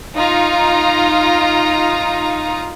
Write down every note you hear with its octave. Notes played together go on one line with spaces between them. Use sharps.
D#4 F4 A#5